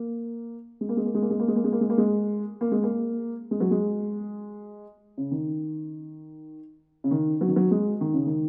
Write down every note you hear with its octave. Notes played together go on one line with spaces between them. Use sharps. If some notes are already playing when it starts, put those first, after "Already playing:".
Already playing: A#3
G#3
A#3
G#3
A#3
G#3
A#3
G#3
A#3
G#3
A#3
G#3
A#3
G#3
A#3
G#3
A#3
G#3
A#3
G#3
F#3
G#3
C#3
D#3
C#3
D#3
F#3
D#3
F#3
G#3
D#3
C#3
D#3